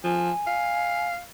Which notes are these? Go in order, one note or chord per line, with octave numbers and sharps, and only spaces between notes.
F3 G#5
F5